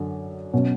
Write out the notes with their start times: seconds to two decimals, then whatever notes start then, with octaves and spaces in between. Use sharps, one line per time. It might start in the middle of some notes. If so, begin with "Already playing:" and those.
Already playing: F#2 D3 D4
0.53 B2 F#3 C#4